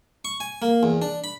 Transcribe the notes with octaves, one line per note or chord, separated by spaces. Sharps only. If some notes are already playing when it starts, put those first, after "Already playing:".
C#6
G#5
A#3
E2
D4
B5